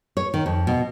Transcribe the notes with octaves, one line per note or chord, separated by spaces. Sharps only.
C#5
D#3
F2
B2